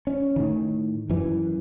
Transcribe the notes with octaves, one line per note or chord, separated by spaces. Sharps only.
C#4
A2 D#3
F#2 E3